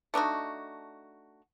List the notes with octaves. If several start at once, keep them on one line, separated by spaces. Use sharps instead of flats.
A3 D4 D#4 F#4